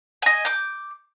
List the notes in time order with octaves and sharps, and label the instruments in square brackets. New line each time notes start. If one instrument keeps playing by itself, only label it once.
[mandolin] D#5 G#5
D6 G6